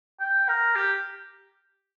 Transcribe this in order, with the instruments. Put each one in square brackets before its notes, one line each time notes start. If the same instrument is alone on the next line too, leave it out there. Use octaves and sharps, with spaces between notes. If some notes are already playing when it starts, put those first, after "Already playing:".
[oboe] G5
A#4
G4